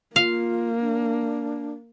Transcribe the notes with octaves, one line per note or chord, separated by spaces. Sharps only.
A#3 F4 F5
D4